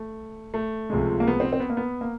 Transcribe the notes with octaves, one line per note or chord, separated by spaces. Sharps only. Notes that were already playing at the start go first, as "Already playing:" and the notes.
Already playing: A3
A3
C#2 C3 F3 G#3
A#3
B3
C4
C4
B3
A#3
B3
A#3